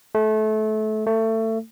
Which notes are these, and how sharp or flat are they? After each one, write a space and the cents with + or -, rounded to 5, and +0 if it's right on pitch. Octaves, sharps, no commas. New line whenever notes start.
A3 -25
A3 +25